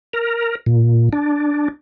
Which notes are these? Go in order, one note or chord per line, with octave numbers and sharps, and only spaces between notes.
A#4
A#2
D4